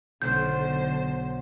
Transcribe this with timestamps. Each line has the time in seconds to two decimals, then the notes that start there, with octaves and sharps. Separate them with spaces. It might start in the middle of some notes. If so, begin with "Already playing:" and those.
0.22 B1 D3 C5 G6